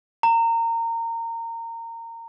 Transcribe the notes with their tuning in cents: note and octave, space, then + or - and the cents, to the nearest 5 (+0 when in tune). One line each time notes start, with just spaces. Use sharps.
A#5 -25